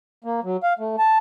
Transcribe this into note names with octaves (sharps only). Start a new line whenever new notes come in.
A#3
F#3
F5
A3
A5